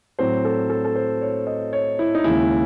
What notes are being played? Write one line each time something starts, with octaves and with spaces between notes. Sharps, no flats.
A2 F#3 C4 C5
A4
A4
A4
C5
C#5
D#5
C#5
E4
D#4
D#2 C#3 G#3 E4